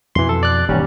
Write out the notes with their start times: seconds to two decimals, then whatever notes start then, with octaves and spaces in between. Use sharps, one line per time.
0.15 F2 B2 E3 C6
0.29 A4
0.43 D5 F#6
0.68 E1 D#2 G#2 E3 G3 C#4